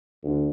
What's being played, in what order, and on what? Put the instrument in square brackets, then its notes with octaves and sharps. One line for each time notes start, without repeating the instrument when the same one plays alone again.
[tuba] D2